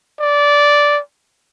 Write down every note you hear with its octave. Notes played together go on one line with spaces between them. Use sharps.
D5